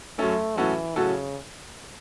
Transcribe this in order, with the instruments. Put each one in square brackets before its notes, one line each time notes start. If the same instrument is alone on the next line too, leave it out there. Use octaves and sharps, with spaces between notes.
[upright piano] F#2 F#3 C#4 A4 [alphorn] A3
[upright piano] A2 F#3 C#4 F#4 A4 [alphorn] E3
[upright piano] A2 F#3 C#4 F#4 A4 [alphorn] C#3